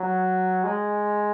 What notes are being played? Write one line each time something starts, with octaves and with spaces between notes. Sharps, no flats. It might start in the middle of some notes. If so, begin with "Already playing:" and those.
Already playing: F#3
G#3